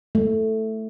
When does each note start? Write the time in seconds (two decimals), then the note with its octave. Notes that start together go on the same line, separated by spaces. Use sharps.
0.15 A3